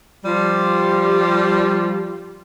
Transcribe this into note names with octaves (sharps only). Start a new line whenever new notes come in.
F3 G3